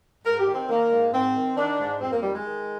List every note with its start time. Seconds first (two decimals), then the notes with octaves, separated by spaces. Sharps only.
0.24 G#2 A#4
0.39 G4
0.46 D#3
0.54 C4
0.68 D#3 A#3
0.91 G#2
1.12 G#2 C4
1.34 D#3
1.56 D#3 D4
1.79 G#2
2.00 F2 C4
2.12 A#3
2.22 D#3 G3
2.34 G#3
2.44 D#3